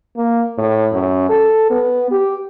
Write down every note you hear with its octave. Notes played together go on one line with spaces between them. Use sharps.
A#3
A2
F#2
A4
B3
G4